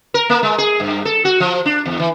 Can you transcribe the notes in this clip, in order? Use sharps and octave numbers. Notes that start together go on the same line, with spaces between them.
A#4
A#3
G#3
G#4
G2
A4
F#4
F3
D4
E2
E3